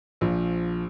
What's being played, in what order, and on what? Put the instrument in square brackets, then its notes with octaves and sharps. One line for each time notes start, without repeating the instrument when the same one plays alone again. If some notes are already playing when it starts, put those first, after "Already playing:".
[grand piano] A#1 F3